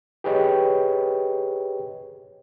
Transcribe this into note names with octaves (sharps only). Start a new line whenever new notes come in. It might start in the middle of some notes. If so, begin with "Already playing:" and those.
G4 G#4 B4 C#5 D#5 G5